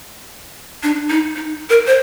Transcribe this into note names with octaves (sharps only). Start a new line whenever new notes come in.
D4
D#4
D#4
A#4
C5